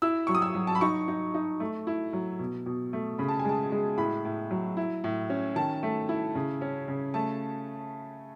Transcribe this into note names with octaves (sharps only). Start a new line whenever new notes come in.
E4 E6
F#3 C#6
D#6
E6
F#3
A5
B5
D#4 C#6
D#4
D#4
A3
E4
F#3
B2
B2
A3
C#3 B5
A5
G#5
G#3 A5
G#3
A2 B5
A2
F#3
E4
A2
C#4
D#3 A5
A3
E4
C#3
C#4
C#3
A3 A5